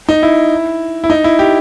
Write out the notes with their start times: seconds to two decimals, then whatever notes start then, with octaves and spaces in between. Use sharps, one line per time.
0.09 D#4
0.23 E4
1.04 E4
1.10 D#4
1.24 E4
1.39 G4